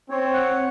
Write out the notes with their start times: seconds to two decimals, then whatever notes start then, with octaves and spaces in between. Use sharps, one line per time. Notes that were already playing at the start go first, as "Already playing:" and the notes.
0.10 C4 C#5
0.33 F#5